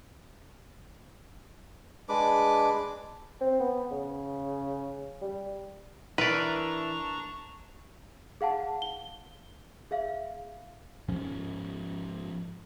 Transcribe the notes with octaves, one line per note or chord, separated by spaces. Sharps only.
G#3 D4 B4 D6
C4
B3
C#3
G3
E3 D4 A#4 B4 D5 A#5 C#6
G#4 F5 F#5 A5
G7
G#4 E5 F5
G#2 F3 C#4